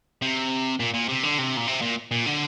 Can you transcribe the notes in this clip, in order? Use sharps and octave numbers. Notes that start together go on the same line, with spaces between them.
C3
A#2
A#2
C3
D3
C3
A#2
C3
A#2
A#2
D3